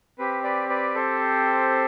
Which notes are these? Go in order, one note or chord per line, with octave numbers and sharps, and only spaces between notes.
C4 G4 B4
B4 D5
B4 D5
A4 C5